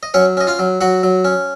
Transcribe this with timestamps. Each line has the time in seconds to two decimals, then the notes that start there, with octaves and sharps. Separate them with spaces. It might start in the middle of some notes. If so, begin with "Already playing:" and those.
0.03 D#5
0.14 F#3 C#4 C#5
0.37 C#4 D#5
0.47 F4 F5
0.59 F#3
0.81 F#3 F#4 F#5
1.03 F#3
1.25 C#4